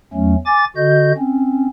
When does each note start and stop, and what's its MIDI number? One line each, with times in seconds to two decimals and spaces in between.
0.14 0.36 40
0.14 0.36 54
0.14 0.36 57
0.14 0.36 61
0.46 0.65 80
0.46 0.65 86
0.46 0.65 93
0.76 1.12 50
0.76 1.12 66
0.76 1.12 75
0.76 1.12 91
1.18 1.67 60
1.18 1.67 61